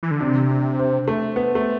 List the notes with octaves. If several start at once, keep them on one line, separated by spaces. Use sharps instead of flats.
E3
D3
C3 D4
D4
C4
A3
B3
A3